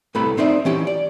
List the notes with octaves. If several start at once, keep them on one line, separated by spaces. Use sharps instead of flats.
C2 A2 C3 A3 B4 B5
C4 D#4 C5 D5 E5
E3 C#4 G4
D5